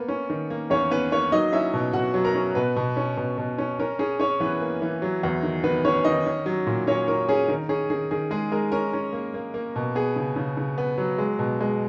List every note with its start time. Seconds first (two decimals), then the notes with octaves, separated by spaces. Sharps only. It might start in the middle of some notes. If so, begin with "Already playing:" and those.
Already playing: A#3 B3
0.08 C#4
0.30 D#3
0.50 A#3
0.70 E2 C#4 C#5
0.91 B3 C#4 B4
1.12 A#3 C#4 C#5
1.32 F#3 D#4 D#5
1.52 C#4 E4 E5
1.74 B2
1.93 B2 F#4 F#5
2.14 F#3
2.25 A#4 A#5
2.35 C#4
2.55 B2 B3 B4
2.76 B2
2.97 C#4
3.17 B2
3.38 B2
3.58 C#4
3.80 C#4 A#4
3.99 C#4 G#4
4.20 C#4 C#5
4.40 E3 B3 B4
4.61 A#3
4.82 E3
5.02 F#3
5.23 E2
5.43 D#3
5.64 D#3 B3 B4
5.85 D#3 C#4 C#5
6.04 D#3 D#4 D#5
6.26 C#4
6.46 F#3
6.67 A#2
6.87 C#4 C#5
7.08 C#4 A#4
7.29 C#4 G#4
7.48 D#3 A#4
7.69 C#4 G#4
7.90 D#3 G#4
8.11 D#3 G#4
8.31 G#3 G#4
8.52 G#3 A#4
8.72 C#4 A#4
8.93 C#4
9.13 A#3
9.34 A#3
9.54 A#3
9.76 B2
9.95 B3 G#4
10.16 C#3
10.36 C#3
10.57 C#3
10.78 B3
10.98 F#3
11.18 G#3
11.39 B2
11.61 G#3